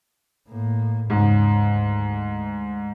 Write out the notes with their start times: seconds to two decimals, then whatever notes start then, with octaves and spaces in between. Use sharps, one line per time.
0.48 A2 A#3
1.10 D#2 G#2 C#3
1.70 D2